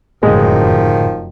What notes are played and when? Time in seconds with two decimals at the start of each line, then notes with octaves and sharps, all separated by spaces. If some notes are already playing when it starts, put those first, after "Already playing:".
0.23 F1 F#2 A2 D3 D#3 F3 G#3